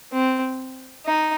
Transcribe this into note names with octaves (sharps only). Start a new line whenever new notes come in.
C4
D#4